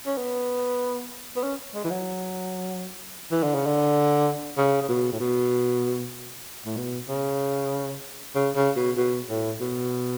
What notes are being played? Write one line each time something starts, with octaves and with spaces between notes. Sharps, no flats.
C#4
B3
B3
C#4
G#3
E3
F#3
E3
D3
C#3
D3
C#3
C#3
B2
A2
B2
A2
B2
C#3
C#3
C#3
B2
B2
A2
B2